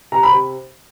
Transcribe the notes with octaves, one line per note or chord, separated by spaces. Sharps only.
C3 A#5
B5
C3